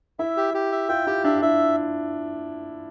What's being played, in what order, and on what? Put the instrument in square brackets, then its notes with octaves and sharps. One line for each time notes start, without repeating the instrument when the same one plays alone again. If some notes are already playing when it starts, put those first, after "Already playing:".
[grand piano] E4 [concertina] E5
[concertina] G4
G4
E5
[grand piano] F4 [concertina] G5
[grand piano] E4 [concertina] G4
[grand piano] D4 [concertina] E5
[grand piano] E4 [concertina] E5